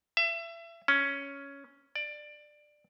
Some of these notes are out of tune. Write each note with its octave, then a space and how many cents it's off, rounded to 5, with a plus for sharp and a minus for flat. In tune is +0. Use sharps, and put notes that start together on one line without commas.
E5 +30
C#4 +5
D5 +15